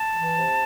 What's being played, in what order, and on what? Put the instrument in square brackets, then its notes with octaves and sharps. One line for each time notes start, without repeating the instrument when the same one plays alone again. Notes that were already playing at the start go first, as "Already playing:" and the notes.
Already playing: [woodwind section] A5
E3
C3